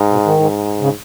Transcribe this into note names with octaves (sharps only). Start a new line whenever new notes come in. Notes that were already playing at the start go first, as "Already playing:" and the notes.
Already playing: G#2
B2
D#3
G#2
C#3